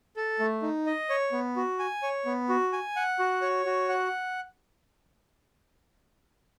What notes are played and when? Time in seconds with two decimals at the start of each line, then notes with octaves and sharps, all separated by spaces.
0.16 A4
0.39 A3
0.62 D#4
0.86 D#5
1.09 C#5
1.32 B3
1.56 F#4
1.79 G#5
2.03 C#5
2.26 B3
2.49 F#4
2.73 G#5
2.96 F#5
3.19 F#4
3.42 C#5
3.65 F#4
3.89 F#5